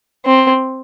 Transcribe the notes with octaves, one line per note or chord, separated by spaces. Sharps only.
C4